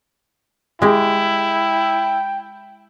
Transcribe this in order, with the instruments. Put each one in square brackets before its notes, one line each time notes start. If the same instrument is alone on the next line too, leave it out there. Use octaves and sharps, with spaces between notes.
[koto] G#3 G4 [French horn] E4 [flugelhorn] G5